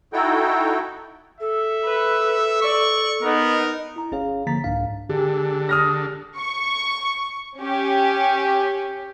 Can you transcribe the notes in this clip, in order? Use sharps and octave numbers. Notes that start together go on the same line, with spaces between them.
D#4 E4 F#4 A4 G5
A4 E5
B4
D5 C#6
B3 D#4 A#4
E4 A#5
G1 C#4 G#4 C#5 F5 A#5
D3 F3 A#3 A#5 A6 B6
C2 G#2 D4 F5 A#5
D3 G4 G#4
D#6 F6 A#6
C#6
C#4 G4